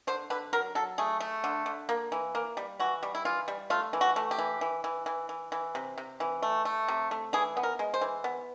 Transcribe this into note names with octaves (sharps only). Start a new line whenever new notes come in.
D3 C5
D3 B4
F#3 A#4
F#3 A4
A3 G#4
A3
D3
D3
A#3
E3
A#3
G3
E3 F#4
G3
E4
E3 F4
G3
A3 F4
E3
F#4
A3
G4
E3
E3
E3
E3
E3
E3
C3
C3
E3
A3
A3
C3
A3
E3 G#4
B3
A#4
G#3
C5
E3
B3